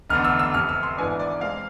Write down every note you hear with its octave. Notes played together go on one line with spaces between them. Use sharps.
F1 E2 D3 F6
E6
E6
F1 F2 C3 F6
E6
C6
G#1 G#2 E3 B3 D4 G#5
D5
G#3 C4 F5